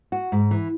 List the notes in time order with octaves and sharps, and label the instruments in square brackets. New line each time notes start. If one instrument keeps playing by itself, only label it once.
[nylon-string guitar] F#4
G#2
E3